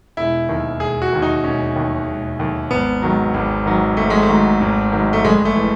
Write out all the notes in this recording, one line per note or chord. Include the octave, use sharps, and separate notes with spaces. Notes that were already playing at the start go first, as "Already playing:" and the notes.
E1 E4
D#2 D#3
E1 G#4
F#4
D#2 D#3
D#4
E1 C#4
D#2 D#3
E1
D#2 D#3
G#1 B3
G#2 D#3 F#3
G#1
G#2 D#3 F#3
G#1 A3
G#3
A3
G#2 D#3 F#3
G#1
G#2 D#3 F#3
A3
F#1 G#3
A3
E3